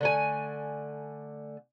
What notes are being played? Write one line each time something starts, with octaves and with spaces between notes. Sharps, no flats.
D3 A3 G#5